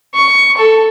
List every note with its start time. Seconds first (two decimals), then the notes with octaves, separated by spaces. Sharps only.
0.14 C#6
0.57 A4